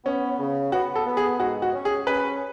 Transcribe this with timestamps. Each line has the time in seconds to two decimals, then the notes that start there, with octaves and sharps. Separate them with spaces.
0.05 B3 C#4
0.39 C#3
0.72 B3 F#4
0.95 A4
1.06 B3
1.17 G#4
1.40 G#2 F#4
1.62 F#4
1.74 C#4
1.85 G#4
2.07 C#4 B4